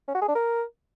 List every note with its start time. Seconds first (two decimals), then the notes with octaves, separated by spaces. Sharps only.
0.08 C#4
0.15 F#4
0.22 G#4
0.28 D4
0.35 A#4